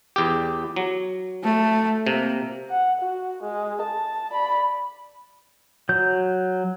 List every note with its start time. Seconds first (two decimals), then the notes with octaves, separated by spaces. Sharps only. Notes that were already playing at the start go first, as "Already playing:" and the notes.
0.16 E2 G4
0.76 F#3
1.44 A3
2.07 C3 A#3
2.70 F#5
3.01 F#4
3.43 G#3
3.83 A5
4.32 D5 B5
5.89 F#3 G6